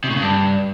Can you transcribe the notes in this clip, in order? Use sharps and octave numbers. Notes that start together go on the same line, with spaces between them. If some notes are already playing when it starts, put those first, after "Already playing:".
C3
A2
C#3
G2